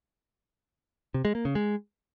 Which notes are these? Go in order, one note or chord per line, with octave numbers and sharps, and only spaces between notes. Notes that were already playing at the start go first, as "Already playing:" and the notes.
C3
G#3
A#3
C#3
G#3